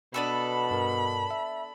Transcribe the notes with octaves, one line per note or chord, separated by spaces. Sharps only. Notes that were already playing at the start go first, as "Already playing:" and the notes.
B2 B3 D4 A4 B5
G2 A#4
E5